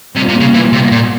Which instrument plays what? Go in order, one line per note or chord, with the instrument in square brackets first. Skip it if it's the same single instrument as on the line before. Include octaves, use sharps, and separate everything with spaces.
[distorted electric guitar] C3 [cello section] G3 A#3 F4
[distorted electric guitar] C3
C#3
E3
C3
A#2